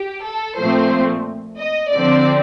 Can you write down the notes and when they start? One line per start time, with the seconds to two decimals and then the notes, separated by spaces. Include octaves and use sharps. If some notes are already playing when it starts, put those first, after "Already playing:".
Already playing: G4
0.25 A4
0.59 A#2 F3 A3 C4 C5
1.59 D#5
1.92 D3 F3 C4 D5